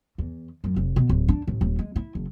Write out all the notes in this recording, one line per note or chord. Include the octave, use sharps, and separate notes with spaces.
E2
F#2
F1
B2
D1
D4
A1
D#1
G#3
E4
F#1